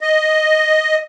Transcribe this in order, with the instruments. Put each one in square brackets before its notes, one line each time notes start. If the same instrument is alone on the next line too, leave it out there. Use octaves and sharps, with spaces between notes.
[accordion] D#5